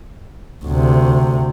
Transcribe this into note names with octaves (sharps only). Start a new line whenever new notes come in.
D2 C3